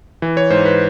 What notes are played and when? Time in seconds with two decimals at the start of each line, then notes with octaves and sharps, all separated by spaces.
0.22 E3
0.37 C#5
0.50 G#2 C5
0.65 B4